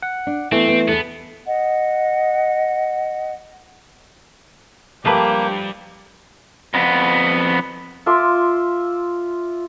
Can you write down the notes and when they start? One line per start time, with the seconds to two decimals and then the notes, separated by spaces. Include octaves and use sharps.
0.02 F#5
0.27 D4
0.52 E3 A3 B3 C4
0.68 B3
0.88 E2 B3 A4
1.47 D#5 F#5
5.05 F3 G3 A3 A#3 G4 B4 A5
6.74 F2 B3
8.06 F4 E5 C6 D6